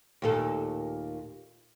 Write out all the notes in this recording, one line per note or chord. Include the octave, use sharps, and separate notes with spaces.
D#2 A#2 A4